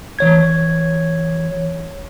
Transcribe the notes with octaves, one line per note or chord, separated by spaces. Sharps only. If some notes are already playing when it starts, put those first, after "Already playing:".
E3 C#5 G#6